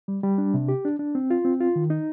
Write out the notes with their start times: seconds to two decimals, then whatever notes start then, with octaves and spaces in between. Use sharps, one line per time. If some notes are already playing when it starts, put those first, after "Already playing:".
0.08 G3
0.24 G3
0.38 D4
0.54 C3
0.68 G4
0.85 D4
0.99 D4
1.15 C4
1.30 F4
1.45 C4
1.61 F4
1.76 D#3
1.90 D#4